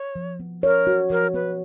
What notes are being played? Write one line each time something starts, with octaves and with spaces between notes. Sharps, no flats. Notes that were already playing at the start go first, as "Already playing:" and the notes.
Already playing: C#5
F3
B3
A#4 C#5
F#4
F3 A#4
B3 B4